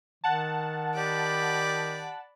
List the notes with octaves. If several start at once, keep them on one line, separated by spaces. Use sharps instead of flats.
D#3 F#5 A5
G4 D5 B5